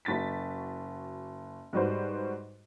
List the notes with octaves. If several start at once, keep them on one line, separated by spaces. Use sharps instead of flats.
F#1 F#4 A6 B6
G#2 G3 F#4 B4 C5